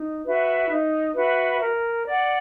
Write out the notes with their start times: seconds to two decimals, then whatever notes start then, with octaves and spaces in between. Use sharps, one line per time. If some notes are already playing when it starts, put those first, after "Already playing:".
Already playing: D#4
0.25 F#4 B4 E5
0.70 D#4
1.16 F#4 B4 E5
1.61 A#4
2.06 D5 F#5